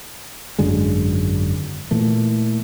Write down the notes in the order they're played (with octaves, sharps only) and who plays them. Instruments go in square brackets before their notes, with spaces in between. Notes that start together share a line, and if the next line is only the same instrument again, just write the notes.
[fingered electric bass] G#1 F#2 D3 G#3
A#2 E3 A3